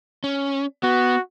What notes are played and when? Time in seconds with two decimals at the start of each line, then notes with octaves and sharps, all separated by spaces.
0.24 C#4
0.83 B3 F#4